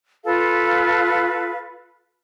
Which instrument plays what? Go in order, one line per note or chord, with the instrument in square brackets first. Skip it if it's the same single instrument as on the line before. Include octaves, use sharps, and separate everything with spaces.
[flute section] F4 A4 B4 F5